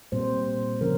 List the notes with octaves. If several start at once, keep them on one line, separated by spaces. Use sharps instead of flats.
A#2 G3 C4 C5
C#3 F3 A#3 C#4 A#4